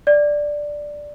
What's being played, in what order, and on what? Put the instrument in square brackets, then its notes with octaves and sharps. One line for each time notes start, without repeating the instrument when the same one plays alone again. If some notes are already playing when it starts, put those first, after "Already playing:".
[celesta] D5